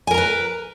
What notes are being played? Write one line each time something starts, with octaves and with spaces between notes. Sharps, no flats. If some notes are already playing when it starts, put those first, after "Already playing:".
A#4 B4 G#5 A#5